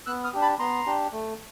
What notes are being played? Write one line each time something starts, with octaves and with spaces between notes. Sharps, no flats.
B3 E6 F#6
D#6 F6
D4 G4
A5 B5
B3 A#5 C6
D4 G4
A3